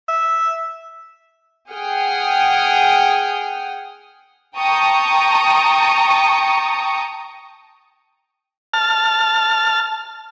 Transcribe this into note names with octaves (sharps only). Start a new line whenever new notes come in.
E5
G#4 F#5 G5 D#6 F6
G5 A5 A#5 C#6 D#6
A5 F6